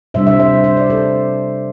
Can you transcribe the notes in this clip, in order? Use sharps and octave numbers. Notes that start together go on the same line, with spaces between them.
C3 G3 D4 C5 E5
C5 E5
C5 E5
C5
D5
A4 C5